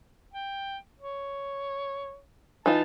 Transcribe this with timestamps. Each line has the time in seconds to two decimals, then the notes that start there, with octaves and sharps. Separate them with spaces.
0.33 G5
1.00 C#5
2.66 E3 D#4 F4 A5